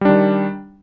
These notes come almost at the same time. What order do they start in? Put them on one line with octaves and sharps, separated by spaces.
G3 D4 D#3